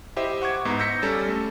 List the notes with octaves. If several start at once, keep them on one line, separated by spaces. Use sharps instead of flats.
E4 G4 C5 D#5 E5
F#5 C#6 D6 G#6
G#2 B3 A#5
E6 G6 A#6 B6 C#7
G3 C#4 A4
A3